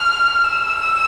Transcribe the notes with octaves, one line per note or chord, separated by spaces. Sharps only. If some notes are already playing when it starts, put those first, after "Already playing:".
Already playing: F6
E6